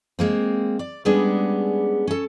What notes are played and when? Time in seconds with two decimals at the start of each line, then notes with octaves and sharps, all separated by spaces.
0.19 G#3 A#3 C4
0.79 D5
1.05 G3 G#3 B3 C#4 D4 G#4
2.07 C#4 A4